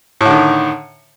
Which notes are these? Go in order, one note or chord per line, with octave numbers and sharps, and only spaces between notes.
A2 D3 D#3